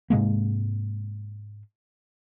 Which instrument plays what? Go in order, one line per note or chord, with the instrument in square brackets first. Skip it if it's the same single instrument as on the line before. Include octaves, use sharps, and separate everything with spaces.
[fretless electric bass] G#2 C3 G#3 A#3